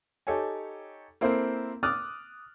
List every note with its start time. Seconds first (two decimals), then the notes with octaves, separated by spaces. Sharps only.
0.27 D#4 G4 A4 C#5 G#5
1.21 A#3 C4 E4 A4 C5
1.83 D6 D#6 F6 F#6 A6